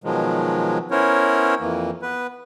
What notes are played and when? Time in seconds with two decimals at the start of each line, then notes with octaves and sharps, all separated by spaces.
0.04 B2 D#3 F3 F#3 G#3
0.91 B3 C#4 E4 A#4 C5 C#5
1.60 F2 E3 A#3
2.02 B3 B4